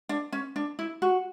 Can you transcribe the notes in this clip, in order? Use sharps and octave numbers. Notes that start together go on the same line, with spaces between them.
D4
C#4
D4
E4
F#4